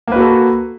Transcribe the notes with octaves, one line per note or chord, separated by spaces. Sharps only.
A#3 F#4 A4 B4